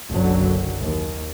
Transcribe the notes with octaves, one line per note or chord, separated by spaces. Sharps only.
F#1 B1 D3 F#3
D#2